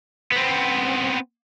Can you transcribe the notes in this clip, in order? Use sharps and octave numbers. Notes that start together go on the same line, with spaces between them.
B3 C4